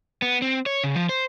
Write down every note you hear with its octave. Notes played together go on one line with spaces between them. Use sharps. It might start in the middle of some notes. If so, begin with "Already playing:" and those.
B3
C4
C#5
C#3
F3
C5